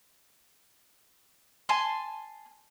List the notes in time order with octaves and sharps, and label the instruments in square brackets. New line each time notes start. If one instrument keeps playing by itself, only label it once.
[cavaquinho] G#5 A5 C6